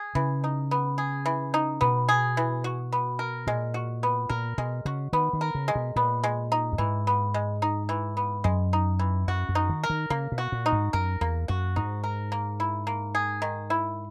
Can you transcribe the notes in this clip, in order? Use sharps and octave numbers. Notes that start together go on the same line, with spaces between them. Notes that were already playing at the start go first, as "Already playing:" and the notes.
Already playing: G#4
C#3 E3
D#4
B3
G#4
E3
D#4
B2 B3
G#4
E3
F#4
B3
A#4
A#2 G#3
F#4
B3
A#2 A#4
B2 G#3
C#3 F#4
D#3 B3
D#3
A#4
C#3
G#3
B2
A#2 B3
G#3
D#4
F#2
G#2 E3
B3
G#3
D#4
E3
B3
F#2 G#3
D#4
E3
F#2 F#4
F#2
D#4
D#3
A#4
D#3
C#3 A#3
B2
F#4
A#2
D#4
G#2
F#2 A#4
E2 A#3
F#2 F#4
G#2 D#4
A#4
A#3
E4
A#3
G#4
D#3
E4